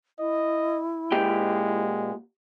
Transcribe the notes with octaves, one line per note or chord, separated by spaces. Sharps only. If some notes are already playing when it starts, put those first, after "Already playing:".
E4 D#5
A#2 G#3 G4 G5